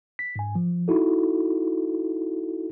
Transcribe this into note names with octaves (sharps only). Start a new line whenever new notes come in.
B6
G#2 G#5
F3
D#4 E4 F#4 A4